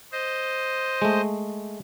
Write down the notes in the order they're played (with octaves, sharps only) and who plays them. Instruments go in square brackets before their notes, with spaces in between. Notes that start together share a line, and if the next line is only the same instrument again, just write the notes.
[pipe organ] C5 D#5
[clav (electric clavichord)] G#3 A3